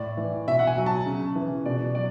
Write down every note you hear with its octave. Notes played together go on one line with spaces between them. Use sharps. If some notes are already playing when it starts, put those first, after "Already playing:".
Already playing: A2 D5
E3
B2 E5
F#5
G#5
F#3
A5
C#3
E3
B2 D5
F#3 D5